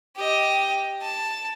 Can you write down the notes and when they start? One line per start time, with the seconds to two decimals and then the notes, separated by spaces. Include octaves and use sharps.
0.16 G4 D#5
1.02 A5